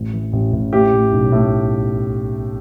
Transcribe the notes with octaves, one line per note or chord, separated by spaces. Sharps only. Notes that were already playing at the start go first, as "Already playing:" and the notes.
Already playing: A1
E3
A1
A1
A2 G4
A2
B1
A2